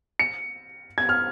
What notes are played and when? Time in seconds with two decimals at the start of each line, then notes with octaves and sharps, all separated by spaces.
0.19 C#7
0.98 G#6
1.09 F6